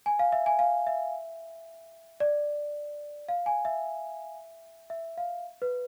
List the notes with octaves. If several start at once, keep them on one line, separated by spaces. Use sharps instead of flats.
G#5
F5
E5
G#5
F5
E5
D5
F5
G#5
E5
E5
F5
B4